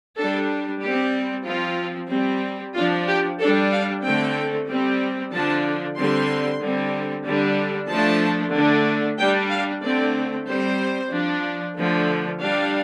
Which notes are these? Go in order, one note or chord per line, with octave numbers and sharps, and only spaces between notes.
G3 D4 A4
G3 C4 G4
F3 C4 F4
G3 C4
F3 D4 F4
G4
G3 D4 A4
F5
D3 A3 C4 G5
G3 C4
D3 F3 D4 A5
D3 G3 C4 C6
D3 G3 C4
D3 G3 D4
F3 A3 D4 A5
D3 A3 D4
G3 D4 G5
F5
D3 A3 C4 D5
G3 C4 C5
F3 D4
D3 F3 A3
G3 D4 F5